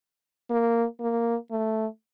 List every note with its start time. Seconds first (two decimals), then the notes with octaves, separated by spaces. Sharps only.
0.50 A#3
1.00 A#3
1.51 A3